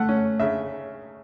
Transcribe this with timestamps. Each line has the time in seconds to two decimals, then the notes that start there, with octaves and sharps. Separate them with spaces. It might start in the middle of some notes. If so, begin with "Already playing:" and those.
Already playing: A3 F#5
0.09 C#4
0.40 C#3 E5